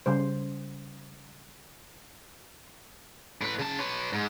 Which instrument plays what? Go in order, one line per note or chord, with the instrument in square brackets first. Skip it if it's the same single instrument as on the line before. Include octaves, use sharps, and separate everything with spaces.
[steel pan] C#3 G3 C5
[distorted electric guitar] A2 B4
C#3 A5
B4 C#5
G#2